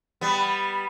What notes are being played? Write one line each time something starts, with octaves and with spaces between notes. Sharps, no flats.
G3 B3